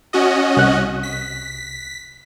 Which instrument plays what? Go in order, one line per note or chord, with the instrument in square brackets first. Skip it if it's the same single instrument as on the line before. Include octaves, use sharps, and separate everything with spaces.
[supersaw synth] C#4 F#4 D#5
[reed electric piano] C2 F#6
[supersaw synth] B6